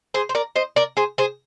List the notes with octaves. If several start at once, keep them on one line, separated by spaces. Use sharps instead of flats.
G#4 C5
C5
A#4 D5
C5 D#5
A#4 D5
G#4 C5
G#4 C5